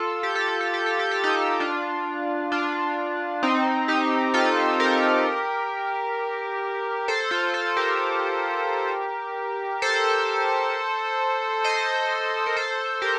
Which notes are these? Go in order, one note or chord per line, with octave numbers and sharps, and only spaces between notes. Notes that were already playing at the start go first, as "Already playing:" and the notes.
Already playing: F4 A4
G4
A4
G4
A4
G4
A4
G4
A4
D#4 G4
D4 F4
D4 F4
C4 D#4
D#4 G4
F4 A4
G4 A#4
A4 C5
F4 A4
F4 A4
G4 A#4
A4 C5
C5 D#5
A#4
A4 C5
G4 A#4